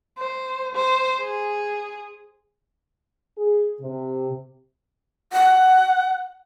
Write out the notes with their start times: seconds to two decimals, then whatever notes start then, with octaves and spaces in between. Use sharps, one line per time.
0.18 C5
0.75 C5
1.21 G#4
3.38 G#4
3.81 C3
5.33 F#5